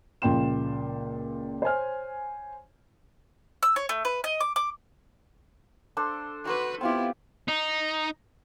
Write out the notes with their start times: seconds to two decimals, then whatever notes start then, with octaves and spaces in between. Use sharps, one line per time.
0.22 C#2 A#2 F3 G5 C6 E7
1.62 C5 C#5 G#5 F6
3.63 E6
3.76 C#5
3.89 A3
4.05 B4
4.24 D#5
4.41 D6
4.56 D6
5.97 D4 A4 C5
6.45 F#4 B4 C5 C#6
6.81 B3 C4 E4 F4 G4
7.48 D#4